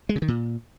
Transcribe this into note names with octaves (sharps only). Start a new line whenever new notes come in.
G#3
C#3
D#3
A#2